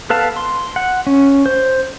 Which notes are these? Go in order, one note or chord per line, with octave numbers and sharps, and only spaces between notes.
B3 A4 B4 F5 A5
C6
F#5
C#4
C5